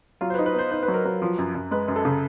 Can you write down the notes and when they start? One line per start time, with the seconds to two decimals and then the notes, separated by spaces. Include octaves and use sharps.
0.21 F#3 F4
0.30 C5
0.34 B4
0.39 D#4
0.46 B4
0.54 B3 C5
0.71 D#4 C5
0.83 B4
0.88 F#3
0.94 A#4
1.05 F#3 B4
1.22 F3
1.38 F#2
1.55 F#2
1.71 G#3 B4
1.88 F#2
1.96 A4
2.05 C#3